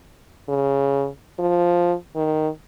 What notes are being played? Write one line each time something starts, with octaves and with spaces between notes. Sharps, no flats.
C#3
F3
D#3